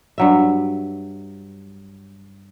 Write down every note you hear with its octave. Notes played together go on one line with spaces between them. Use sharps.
G2 F#3 E5